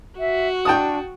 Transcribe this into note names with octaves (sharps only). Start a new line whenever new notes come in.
F#4 E5
D4 G5 A5 D#6